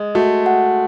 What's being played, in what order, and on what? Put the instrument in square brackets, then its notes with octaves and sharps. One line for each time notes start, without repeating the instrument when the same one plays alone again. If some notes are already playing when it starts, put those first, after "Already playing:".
Already playing: [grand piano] G#3 [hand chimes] D#5
[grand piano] A3 [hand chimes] F#4
[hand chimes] F#5